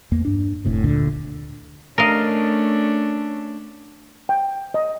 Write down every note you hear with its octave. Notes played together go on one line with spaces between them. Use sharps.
E2 A#3
G2 D4
F1 A2 C3
D2 A#2 D3
A3 C#4 D4 A#4 D#5 F5
G5
D#5